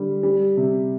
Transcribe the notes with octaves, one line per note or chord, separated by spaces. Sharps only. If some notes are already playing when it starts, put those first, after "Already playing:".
Already playing: D3 G3
G3
C3